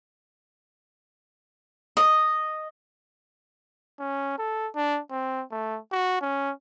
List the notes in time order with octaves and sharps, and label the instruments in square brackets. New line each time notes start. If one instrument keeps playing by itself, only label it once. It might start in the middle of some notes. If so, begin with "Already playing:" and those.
[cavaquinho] D#5
[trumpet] C#4
A4
D4
C4
A3
F#4
C#4